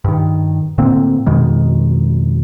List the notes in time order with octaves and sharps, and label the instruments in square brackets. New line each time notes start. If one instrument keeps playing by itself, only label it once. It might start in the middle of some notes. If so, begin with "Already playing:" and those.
[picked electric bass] G2 D#3
A2 D3 A#3 C4
F2 B2 D#3 G#3